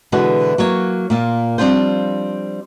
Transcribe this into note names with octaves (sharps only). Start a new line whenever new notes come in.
B2 D3 E3 G#3 F#4
F#3 A#3 C#5
A#2 A#3 F4
F3 G3 C4 D4 F4 C5